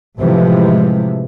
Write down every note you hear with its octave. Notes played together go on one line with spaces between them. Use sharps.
A2 C3 E3 F3 G#3